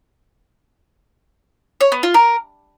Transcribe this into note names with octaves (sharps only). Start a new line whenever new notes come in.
C#5
B3
F4
A#4